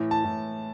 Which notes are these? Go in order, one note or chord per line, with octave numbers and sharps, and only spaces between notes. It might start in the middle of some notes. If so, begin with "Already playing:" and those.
Already playing: A2 E3
A5
A2